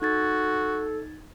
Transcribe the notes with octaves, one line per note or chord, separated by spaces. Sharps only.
D#4 F#4 A4 G#6 A6